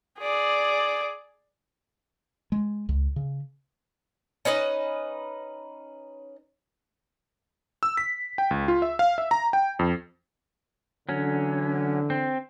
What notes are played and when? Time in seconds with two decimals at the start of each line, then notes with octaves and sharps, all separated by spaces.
0.18 G#4 D5
2.52 G#3
2.89 C#2
3.16 C#3
4.45 C#4 D#4 B4 D#5
7.83 E6
7.97 B6
8.38 G5
8.51 C#2
8.68 F4
8.82 E5
8.99 F5
9.18 E5
9.31 A#5
9.53 G5
9.79 F2
11.09 D3 E3 F#3 C#4
12.10 C4